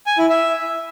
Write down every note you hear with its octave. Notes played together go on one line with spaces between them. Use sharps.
G#5
E4
E5